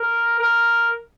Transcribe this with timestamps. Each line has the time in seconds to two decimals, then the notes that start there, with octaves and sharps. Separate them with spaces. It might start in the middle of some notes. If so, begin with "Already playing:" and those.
Already playing: A#4
0.40 A#4